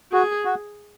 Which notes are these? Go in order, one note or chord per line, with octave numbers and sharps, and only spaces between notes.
F#4 G#4
F#4